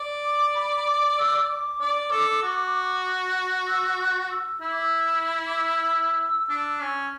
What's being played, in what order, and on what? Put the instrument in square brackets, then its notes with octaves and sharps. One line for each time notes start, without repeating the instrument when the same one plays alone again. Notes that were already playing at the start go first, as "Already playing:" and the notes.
Already playing: [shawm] D5
[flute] D6
B5
D6
E6
D6
[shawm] D5
A4
F#4
[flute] E6
F#6
E6
[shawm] E4 [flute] E6
[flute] D6
E6
D6
E6
[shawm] D4
C#4